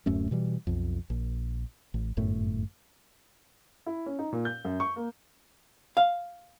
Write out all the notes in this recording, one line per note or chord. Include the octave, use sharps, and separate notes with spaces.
D1 F#2 A3 C#4
B2 E3 G3
B1 F2
A#1
A1
G1 F#2 A2 A3
E4
C#4
D#4
A#2
G6
F#2
C#6
A#3
F5